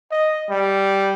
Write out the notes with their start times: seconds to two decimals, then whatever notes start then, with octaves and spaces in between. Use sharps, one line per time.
0.11 D#5
0.50 G3